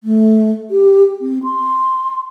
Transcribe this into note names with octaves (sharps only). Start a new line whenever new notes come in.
A3
G4
C4
C6